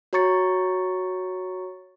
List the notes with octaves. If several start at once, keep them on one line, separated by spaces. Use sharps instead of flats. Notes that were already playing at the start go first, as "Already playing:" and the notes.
F#4 C#5 A#5 C#6 A6 C#7